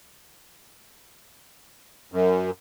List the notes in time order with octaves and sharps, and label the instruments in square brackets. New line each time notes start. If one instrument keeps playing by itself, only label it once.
[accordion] F#2